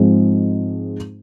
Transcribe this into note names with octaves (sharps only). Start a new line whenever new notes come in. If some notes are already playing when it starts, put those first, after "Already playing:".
Already playing: G#2 F3 G#3 C4 D#4